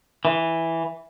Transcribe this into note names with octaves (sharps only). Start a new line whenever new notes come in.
E3